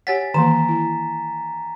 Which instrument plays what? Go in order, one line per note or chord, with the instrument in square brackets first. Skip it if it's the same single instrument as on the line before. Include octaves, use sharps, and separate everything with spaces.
[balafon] G4 C#5 F#5 [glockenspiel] G#5 A6 B6
[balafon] D#3 E3 A#3 [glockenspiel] A#5 E7
[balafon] E4